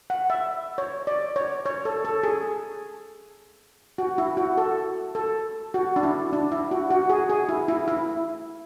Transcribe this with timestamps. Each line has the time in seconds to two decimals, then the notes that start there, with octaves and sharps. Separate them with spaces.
0.10 F#5
0.30 E5
0.78 C#5
1.07 D5
1.36 C#5
1.66 C#5
1.85 A4
2.05 A4
2.23 G#4
3.98 F#4
4.18 E4
4.37 F#4
4.58 A4
5.15 A4
5.74 F#4
5.96 D4
6.03 E4
6.33 D4
6.52 E4
6.71 F#4
6.91 F#4
7.10 G#4
7.30 G#4
7.49 E4
7.68 E4
7.88 E4